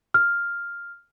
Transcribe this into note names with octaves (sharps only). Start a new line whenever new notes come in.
F6